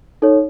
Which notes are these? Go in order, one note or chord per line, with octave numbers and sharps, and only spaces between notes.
D#4 A4 C#5